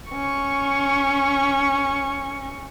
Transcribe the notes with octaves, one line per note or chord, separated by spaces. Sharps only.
C#4 C#6